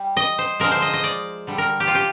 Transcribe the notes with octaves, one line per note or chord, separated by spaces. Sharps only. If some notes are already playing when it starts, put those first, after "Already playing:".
Already playing: G3
D#5
C5
D3 F3 G#3 A#4
C5
D#5
D#5
D5
D3 G3
A#4
G4
F4
G4